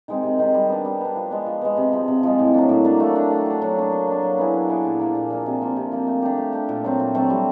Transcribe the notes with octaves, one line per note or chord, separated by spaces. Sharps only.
D#3 G#3 C4
C3
D#3 G#3 C4
G3
B3 D4
G3
B3 D4
F3
G#3 B3
F3
G#3 B3
C3
F3 G#3
C3
F3 G#3
A2
F#3 A#3 D4
A2
F#3 A#3 D4
A3
D4 F#4
A3
D4 F#4
F#3
A#3 D4
F#3
A#3 D4
F#3
B3 E4 G#4
F#3
B3 E4 G#4
A#2
F3 A#3
A#2
F3 A#3
C3
F3 A#3
C3
F3 A#3
A3
D4 G4
A3
D4 G4
A#2
F#3 A3 C4
A#2
F#3 A3 C4
G3